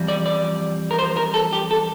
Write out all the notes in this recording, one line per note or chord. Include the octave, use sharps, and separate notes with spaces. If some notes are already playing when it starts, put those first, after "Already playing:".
Already playing: F2 E3 G3
D5
D5
A#4
C5
A#4
A4
G4
A4